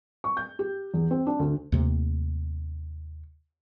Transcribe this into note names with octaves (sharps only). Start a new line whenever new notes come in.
C#6
G6
G4
E2
C4
D4
D2
D#2 C3 A3